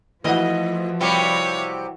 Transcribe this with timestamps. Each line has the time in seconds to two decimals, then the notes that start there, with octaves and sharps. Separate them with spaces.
0.24 E3 F3 A3 E4 F#4 D#5
1.01 C3 G3 G4 C#5 F5